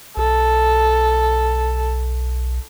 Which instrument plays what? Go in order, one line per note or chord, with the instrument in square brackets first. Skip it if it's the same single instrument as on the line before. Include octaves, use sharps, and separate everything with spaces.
[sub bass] B1 [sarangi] A4